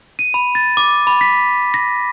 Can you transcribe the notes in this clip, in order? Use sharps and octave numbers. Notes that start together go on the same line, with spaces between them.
D#7
B5
A6
D6
B5
B6
A#6